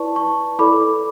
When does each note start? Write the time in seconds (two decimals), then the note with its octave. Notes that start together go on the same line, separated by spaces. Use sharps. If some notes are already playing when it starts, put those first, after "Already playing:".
Already playing: E4 B4 D5 A5 C#6
0.15 A5 C#6
0.59 E4 A4 D5 B5 D6